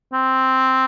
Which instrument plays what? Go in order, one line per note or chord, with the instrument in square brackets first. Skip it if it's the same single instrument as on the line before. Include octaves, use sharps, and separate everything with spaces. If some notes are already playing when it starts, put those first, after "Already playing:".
[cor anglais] C4